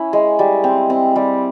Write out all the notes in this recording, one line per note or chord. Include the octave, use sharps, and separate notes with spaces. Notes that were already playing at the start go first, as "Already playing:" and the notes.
Already playing: C#4 E4
G#3
G3
C4
C4
G3